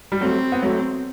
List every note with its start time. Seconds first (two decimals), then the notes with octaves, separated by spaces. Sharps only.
0.12 G3
0.20 F#3 A3 C4
0.52 B3
0.62 F#3 A3